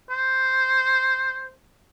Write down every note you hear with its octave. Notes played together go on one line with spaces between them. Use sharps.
C5